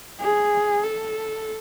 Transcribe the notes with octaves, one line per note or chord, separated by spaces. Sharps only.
G#4
A4